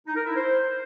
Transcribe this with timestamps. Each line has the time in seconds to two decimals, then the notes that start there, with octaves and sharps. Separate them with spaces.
0.06 D#4
0.16 A#4
0.26 E4
0.36 C5